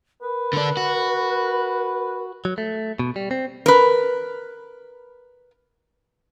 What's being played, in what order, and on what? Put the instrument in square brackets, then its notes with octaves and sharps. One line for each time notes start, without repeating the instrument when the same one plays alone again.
[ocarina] A#4 [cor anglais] B4
[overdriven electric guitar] D3 D4
F#4
[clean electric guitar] F#3
A3
B2
G3
C4
[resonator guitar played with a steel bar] A#4 B4